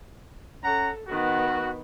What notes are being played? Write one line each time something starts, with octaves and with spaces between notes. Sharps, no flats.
C#4 A4 F#5 A#5
D#3 B3 F#4